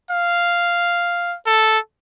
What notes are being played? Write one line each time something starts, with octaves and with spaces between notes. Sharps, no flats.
F5
A4